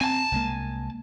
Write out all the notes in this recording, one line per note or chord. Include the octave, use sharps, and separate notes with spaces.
C4 G#5 A5
C2 G#3 A#3